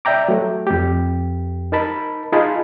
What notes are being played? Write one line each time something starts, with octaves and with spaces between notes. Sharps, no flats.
D5 E5 G5 A#5 D6
F#3 A3
F2 G4
D#4 A#4 A5 B5
D#4 F4 G#4 A5 B5